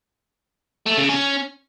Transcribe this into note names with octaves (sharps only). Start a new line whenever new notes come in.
A3
C#3
C#4